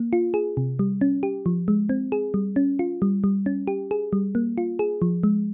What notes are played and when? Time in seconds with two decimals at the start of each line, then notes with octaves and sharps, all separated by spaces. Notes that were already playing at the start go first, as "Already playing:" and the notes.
Already playing: A#3
0.13 F4
0.34 G#4
0.57 C3
0.79 G3
1.01 C#4
1.23 G4
1.46 F3
1.68 G#3
1.89 C4
2.12 G#4
2.34 G3
2.56 C#4
2.79 F4
3.02 G3
3.24 G3
3.46 C#4
3.67 G4
3.91 G#4
4.13 G3
4.35 A#3
4.58 F4
4.79 G#4
5.02 F3
5.23 G#3